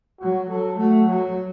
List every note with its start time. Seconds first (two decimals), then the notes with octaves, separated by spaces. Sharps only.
0.21 F#3 F#4
0.50 F#3 A4
0.79 A3 F#4
1.09 F#3